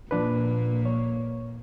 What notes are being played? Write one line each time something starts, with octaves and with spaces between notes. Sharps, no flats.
A#2 F3 A#3 D4 B4
C#5